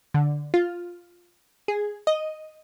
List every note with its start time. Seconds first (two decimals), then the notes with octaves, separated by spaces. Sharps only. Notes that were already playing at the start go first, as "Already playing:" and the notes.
0.14 D3
0.54 F4
1.68 G#4
2.07 D#5